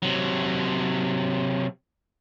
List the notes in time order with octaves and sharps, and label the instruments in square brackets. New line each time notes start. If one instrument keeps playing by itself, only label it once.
[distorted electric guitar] C3 F#3